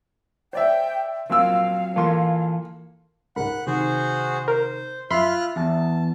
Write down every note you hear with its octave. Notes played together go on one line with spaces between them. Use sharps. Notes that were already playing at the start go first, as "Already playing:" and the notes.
C5 D5 E5 G5
A#2 F#3 C4 F4 F5 E6
E3 A#3 F4 A4 C6
C#2 G#2 A#4 F#5 B5 F#6
C3 D#3 F#4 G#4 C5
A#4 C5
F#2 F4 E5 B5 C6 F6 F#6
E2 A5